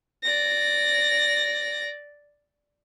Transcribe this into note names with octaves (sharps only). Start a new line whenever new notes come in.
D5 A#6